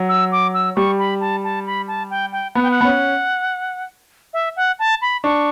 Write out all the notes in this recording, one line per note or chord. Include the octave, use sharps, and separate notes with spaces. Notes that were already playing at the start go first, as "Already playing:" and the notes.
Already playing: F#3
E6
D6
E6
G3 C#6
B5
A5
A5
B5
A5
G5
G5
B3 F#5
G5
F#5
B3
C#4
E5
F#5
A5
B5
D4 C#6